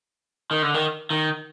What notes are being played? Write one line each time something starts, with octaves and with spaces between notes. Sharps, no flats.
D#3
D3
D#3
D#3